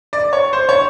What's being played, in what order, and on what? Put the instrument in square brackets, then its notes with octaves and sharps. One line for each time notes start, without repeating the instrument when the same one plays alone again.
[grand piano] D5
C#5
C5
C#5